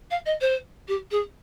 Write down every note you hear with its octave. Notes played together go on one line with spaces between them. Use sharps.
F5
D#5
C5
G4
G#4